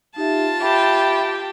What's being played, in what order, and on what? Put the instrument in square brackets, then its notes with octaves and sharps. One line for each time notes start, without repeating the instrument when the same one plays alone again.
[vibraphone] D#4 G4 E5 [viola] F4 A5
[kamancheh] G4 G5 [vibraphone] E5 B5